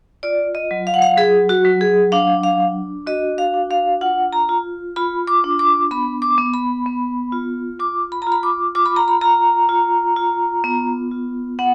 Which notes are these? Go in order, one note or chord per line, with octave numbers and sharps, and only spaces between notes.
F4 D5
D#5
F#3
F5
F#5
F5
F#3 G#4
F#4
F#3
G#4
D4 F5
F5
D4
F#4 D#5
F5
D4
F5
F4 F#5
A#5
F4
F4 B5
D6
D4
D6
B3 B5
D6
B3
B5
B3
F4
F4 D6
B5
F4 A#5
B5
D6
F4 D6
B5
A#5
B5
F4 A#5
F4
F4
B3
F4
B3 F#5